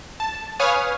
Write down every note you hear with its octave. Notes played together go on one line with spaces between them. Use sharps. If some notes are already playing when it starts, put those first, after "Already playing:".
A5
B4 C#5 F5 G#5 D#6 F6